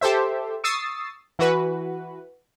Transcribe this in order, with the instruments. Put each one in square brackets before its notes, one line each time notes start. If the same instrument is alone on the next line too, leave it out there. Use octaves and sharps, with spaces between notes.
[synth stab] G4 A4 C5 E5
C#6 D#6 E6 A6 C7
E3 F#4 B4